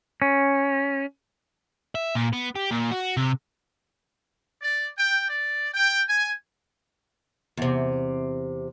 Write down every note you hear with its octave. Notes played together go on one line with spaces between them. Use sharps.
C#4
E5
A#2
B3
G4
A#2
F#4
C3
D5
G5
D5
G5
G#5
E2 C3